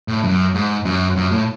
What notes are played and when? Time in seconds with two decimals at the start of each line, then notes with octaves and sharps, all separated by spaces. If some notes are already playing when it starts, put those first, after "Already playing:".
0.08 A2
0.24 F#2
0.54 G#2
0.85 F#2
1.16 F#2
1.31 A2